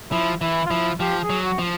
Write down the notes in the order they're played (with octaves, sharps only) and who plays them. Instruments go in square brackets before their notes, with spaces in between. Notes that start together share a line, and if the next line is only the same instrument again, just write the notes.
[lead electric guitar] F3 [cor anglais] E4
[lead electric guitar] E3 [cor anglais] E4
[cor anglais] F4
[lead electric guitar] F3 [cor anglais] E4
[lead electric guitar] F3 [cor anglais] G4
[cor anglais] G#4
[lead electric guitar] F#3
[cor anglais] F#4
[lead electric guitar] F3